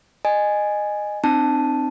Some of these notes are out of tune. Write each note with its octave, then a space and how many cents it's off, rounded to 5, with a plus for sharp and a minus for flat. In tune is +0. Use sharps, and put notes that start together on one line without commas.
D#5 -20 G#5 +0
C4 +0 D#4 -45 A5 +0